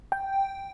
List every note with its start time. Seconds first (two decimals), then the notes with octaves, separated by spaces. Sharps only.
0.12 G5